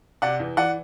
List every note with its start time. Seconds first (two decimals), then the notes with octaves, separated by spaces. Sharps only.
0.22 C3 D5 F#5
0.40 E2
0.57 E3 D5 F#5